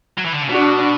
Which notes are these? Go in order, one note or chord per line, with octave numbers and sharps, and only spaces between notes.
F#3
E3
D3
C#3
B2 D4 F#4